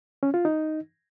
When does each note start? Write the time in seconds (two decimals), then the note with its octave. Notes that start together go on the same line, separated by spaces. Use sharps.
0.23 C#4
0.34 F4
0.45 D#4